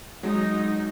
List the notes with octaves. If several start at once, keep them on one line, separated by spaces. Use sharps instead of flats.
F#3 G#3 D#4